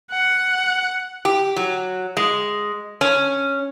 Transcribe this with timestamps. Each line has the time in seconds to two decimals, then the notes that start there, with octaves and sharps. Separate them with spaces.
0.11 F#5
1.25 G4
1.56 F#3
2.17 G#3
3.01 C#4